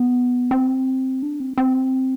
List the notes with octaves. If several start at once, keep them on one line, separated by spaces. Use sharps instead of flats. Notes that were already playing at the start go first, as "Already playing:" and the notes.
Already playing: B3
C4
D4
C4
C4